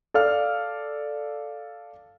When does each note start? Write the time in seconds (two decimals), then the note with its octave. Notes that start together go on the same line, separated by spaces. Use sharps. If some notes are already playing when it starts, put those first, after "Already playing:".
0.14 A4 D5 F5 F6